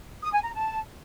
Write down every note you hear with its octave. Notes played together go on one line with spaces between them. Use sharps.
D#6
G#5
A#5
A5